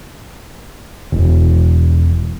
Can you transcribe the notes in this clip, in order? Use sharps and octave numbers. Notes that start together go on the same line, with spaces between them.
E1